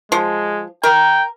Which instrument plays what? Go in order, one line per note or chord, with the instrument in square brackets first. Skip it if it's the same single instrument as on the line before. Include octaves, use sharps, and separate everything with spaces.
[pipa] F3 [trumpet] G#3
[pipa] A#4 [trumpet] G5